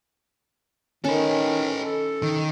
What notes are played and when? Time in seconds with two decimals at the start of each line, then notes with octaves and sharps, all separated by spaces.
1.04 D#3 C#4 A4 B4
1.83 A4
2.22 D#3